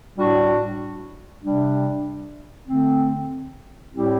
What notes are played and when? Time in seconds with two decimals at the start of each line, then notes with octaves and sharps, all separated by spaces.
0.17 A2 G3 D4 F#4
1.43 C3 G3 D4
2.68 D3 A3 C4
3.93 A2 G3 C4 E4 G4